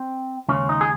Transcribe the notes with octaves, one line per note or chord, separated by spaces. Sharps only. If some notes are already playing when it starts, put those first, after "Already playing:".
Already playing: C4
D#2 C#3 G#3 C#4
D#4
G#4